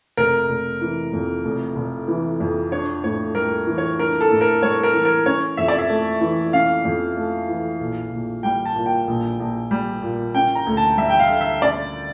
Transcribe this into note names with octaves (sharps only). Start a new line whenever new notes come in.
F1 A#4
F1
E3
F2
F1
F1
E3
F2
D4 C#5
A2 C#5
G3 A#4
E3
C#5
D4 A#4
A4
A2
A#4
G3 C#5
A#4
E3
A#4
C#4 C#5
F2 E5
D5
E5
A3
E3
C#4 F5
F2
A3
E3
A#1
A#1
G3 G5
A5
A#2
G5
A#1
A#1
G3
A#2
C#4 G5
A#5
D2
A5
G3 E5
G5
F5
D3
E5
C#4 D5